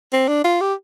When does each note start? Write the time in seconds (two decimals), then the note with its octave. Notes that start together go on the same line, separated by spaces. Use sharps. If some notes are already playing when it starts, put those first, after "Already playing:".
0.13 C4
0.28 D4
0.44 F4
0.61 G4